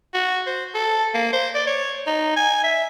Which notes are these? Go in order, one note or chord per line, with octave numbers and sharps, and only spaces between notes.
F#4
C5
A4
A#3
C5
D5
C#5
D#4
G#5
E5